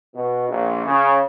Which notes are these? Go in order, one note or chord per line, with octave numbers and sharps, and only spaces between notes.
B2
A#1
C#3